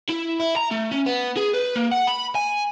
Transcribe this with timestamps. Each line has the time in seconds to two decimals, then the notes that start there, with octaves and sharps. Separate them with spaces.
0.10 E4
0.40 E4
0.57 A#5
0.71 A3
0.92 C#4
1.06 B3
1.37 G#4
1.53 B4
1.76 A#3
1.92 F#5
2.08 B5
2.35 G#5